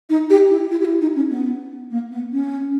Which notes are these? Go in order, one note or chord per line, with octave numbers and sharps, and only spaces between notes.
D#4
G4
E4
E4
G4
E4
D#4
C#4
B3
A#3
B3
C#4